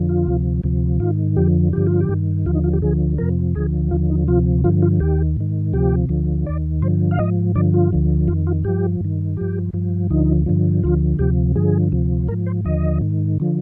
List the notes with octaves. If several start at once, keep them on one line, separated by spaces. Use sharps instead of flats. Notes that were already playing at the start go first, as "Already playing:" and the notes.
Already playing: F2 D3 F3
F4
D2 C3 F3
D2 C3 F3
G#2 D#3 F4
F2 D3 F3 G4
G2 D3 F3 G4
F4
G4
G2 D#3
D#2 D3 F3 F4
D#4
F4
G4
D2 D3 F3 G#4
F2 C3 F3 A#4
D2 D3 F3 G#4
D#2 D3 F3 F4
D#4
D2 C3 F3 F4
G2 D3 F3 F4
F4
D#2 D#3 G4
G#2 D#3
D2 C3 F3 G4
D2 D3 F3
D#2 D#3 D5
G2 D3 F3 C5
F5
G#2 F3 D#5
G2 D3 F3 D5
F4
D2 D3 F3
F2 D#3 F4
F4
G2 F3 G4
G2 D#3
G2 F3 G4
G2 F3
D2 D3 F3 D#4
G2 D3 F3
D2 D3 F3 F4
D2 C3 F3 G4
G2 D3 F3 G#4
D2 C3 F3
G#2 F3 A#4
C5
D#2 D3 F3 D#5
G#2 D#3
D3 F3